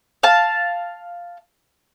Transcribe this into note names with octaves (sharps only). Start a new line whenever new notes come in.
F5 A5